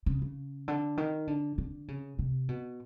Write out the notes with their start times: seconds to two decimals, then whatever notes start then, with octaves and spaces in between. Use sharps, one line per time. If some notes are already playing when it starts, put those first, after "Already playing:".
0.06 C#3
0.22 C#3
0.68 D3
0.97 D#3
1.27 D3
1.58 D3
1.88 C#3
2.19 C3
2.49 B2